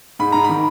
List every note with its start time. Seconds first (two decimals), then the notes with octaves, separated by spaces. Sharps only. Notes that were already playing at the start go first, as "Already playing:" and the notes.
0.19 G#2 B5
0.32 G#2 A#5
0.44 B5
0.49 D#3